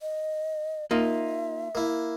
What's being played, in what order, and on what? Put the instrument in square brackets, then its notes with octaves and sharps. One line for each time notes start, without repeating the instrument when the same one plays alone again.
[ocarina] D#5
[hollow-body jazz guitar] A#3 D#4 F4 [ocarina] E5
[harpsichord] A#3 E4